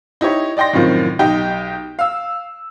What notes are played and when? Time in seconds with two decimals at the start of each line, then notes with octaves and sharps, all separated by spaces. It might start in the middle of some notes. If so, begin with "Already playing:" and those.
0.21 D#4 E4 G4 C#5
0.57 D5 D#5 G5 C6 A#6
0.73 F#2 A2 C3 D#3 F3
1.19 B1 D#4 G4 G5
1.99 F5 E6